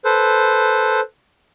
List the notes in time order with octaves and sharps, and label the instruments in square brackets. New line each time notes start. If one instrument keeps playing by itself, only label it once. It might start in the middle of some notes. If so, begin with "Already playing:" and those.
[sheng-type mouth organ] A4 B4 C5